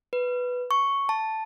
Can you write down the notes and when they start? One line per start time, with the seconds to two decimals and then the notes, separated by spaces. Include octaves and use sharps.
0.13 B4
0.71 C#6
1.09 A5